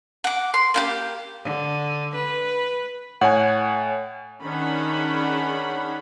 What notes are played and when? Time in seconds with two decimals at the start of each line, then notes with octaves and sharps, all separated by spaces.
0.24 F#5 D6
0.54 C6
0.74 A#3 E4 G4
1.43 D3
2.15 B4
3.21 A2 C#5 F#5 G#5
4.44 D#3 C#4 D4 G#4 F#5 B5